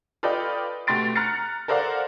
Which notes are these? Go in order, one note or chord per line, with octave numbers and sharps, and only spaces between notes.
F4 A4 B4 D5 D#5 G5
B2 A3 G4 C6 A6 D7
A#5 F6 F#6 A6 C#7
A4 A#4 C5 D5 F5 F#5